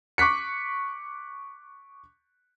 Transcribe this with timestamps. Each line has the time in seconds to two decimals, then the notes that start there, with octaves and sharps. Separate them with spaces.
0.18 C#6 D6 F#6 B6 C#7